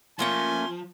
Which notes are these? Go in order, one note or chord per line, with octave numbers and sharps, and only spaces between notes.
F3 A3 A#3 C#4 G#5 C6